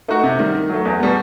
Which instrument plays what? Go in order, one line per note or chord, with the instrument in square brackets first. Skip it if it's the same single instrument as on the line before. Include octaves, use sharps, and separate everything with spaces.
[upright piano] A3 D#4 F#4
C3
D#3 G3
D#3
F#3 A3
E2
B2 G3 B3